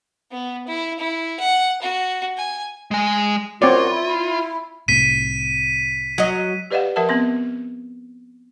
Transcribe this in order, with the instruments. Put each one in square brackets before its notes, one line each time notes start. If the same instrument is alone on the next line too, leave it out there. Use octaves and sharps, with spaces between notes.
[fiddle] B3
E4
E4
F#5
F#4
G#5
[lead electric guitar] G#3 G#5
[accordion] F#2 F#4 [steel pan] C4 C#5 D5 [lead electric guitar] F4
[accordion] E4
[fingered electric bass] C2 A2 C3 [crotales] B6 D#7
[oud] F#3 D#5
[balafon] G4 B4 D5 D#5 F5 F#5
F3 A#4 E5 F#5 A5
B3 C4 C6